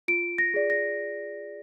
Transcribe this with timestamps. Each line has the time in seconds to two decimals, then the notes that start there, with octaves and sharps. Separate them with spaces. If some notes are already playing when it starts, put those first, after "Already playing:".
0.08 F4 D7
0.38 A#6
0.54 G#4 D5
0.70 A#6